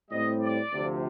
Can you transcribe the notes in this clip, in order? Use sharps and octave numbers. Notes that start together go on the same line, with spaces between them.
A2 G3 C4 D#5
D5
D2 C3 F3